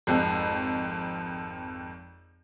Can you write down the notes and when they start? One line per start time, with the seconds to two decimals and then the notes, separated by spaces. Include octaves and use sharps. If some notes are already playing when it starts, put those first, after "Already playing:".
0.07 G#1 F2